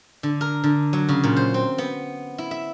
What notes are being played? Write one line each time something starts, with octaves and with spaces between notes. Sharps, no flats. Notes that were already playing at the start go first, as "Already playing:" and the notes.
D3
A#4
D3
F#3
C#3
A#2
C5
C4
B3
E4
E5